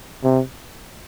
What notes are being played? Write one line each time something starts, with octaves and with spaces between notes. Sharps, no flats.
C3